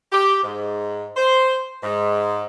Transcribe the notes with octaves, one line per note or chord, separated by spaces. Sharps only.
G4
G#2
C5
G#2